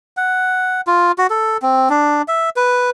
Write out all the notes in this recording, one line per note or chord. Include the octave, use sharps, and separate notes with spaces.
F#5
F4
F#4
A4
C4
D4
E5
B4